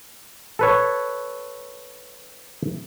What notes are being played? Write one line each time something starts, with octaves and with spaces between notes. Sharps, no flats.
A4 B4 C#5